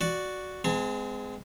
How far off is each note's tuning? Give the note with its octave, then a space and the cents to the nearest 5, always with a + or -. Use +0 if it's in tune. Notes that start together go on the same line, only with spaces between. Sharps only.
F#4 +0 D5 +0
G#3 +0 C4 -40 A5 +45